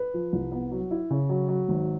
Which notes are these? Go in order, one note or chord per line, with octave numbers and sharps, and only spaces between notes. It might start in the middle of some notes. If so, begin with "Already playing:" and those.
Already playing: B4
F3
C2
B3
F#3
E4
C#3
F#3
F#3
G#1